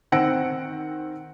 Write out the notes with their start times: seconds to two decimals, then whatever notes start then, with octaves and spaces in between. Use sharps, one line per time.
0.12 D#3 C4 F#5 E6 A#6 D7